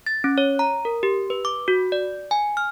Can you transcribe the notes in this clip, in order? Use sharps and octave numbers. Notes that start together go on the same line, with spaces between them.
A6
C#4
C#5
A#5
A#4
G4
B4
D6
F#4
D5
G#5
F6